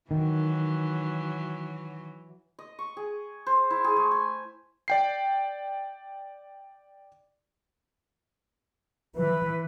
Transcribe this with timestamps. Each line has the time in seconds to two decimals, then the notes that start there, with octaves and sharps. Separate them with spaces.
0.11 D#3 E3 F#3
2.59 D#5
2.79 C#6
2.97 G#4
3.47 C5
3.70 E4
3.84 G#4
3.96 A3
4.11 G#5
4.88 D5 G5 C7
9.16 E3 B4